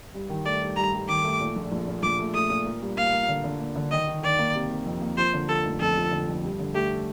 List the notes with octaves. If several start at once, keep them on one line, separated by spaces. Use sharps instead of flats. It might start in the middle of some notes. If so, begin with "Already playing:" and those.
G2
D#3
A3 D5
G2
G2 A#5
G2
D#3 D6
A3
A#2
A#1
A#1
A#2
A#1 D6
A3
A3 D#6
A#2
A#3
G2
A#3 F5
A#3
D3
D3
A#3
D3
D#3 D#5
D#3
D#3 D5
A#3
C3
C3
F2
A#3
F3 C5
D3
F3 A4
F1
F2 A4
F3
D3
F2
G2
D3
A3 G4